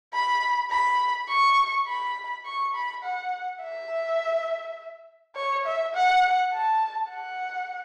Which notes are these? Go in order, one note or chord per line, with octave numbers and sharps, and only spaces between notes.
B5
B5
C#6
B5
C#6
B5
F#5
E5
C#5
E5
F#5
A5
F#5